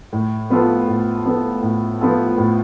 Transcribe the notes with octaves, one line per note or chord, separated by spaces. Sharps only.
A2
F3 B3 F4 A4
A2
F3 B3 F4 A4
A2
F3 B3 F4 A4
A2